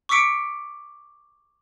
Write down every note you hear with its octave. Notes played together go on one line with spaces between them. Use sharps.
C#6 D6 E6 B6 C#7 D7